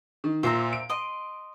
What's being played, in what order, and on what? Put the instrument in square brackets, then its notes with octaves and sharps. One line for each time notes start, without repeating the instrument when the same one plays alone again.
[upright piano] D#3
[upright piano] A#2 [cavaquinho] C5 E5 A#5
[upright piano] D7
[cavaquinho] D#5 C6